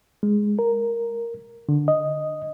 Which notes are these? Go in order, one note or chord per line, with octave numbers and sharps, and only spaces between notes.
G#3
A#4
D3
D#5